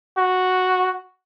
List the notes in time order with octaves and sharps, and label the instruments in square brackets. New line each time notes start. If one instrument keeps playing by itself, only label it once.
[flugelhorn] F#4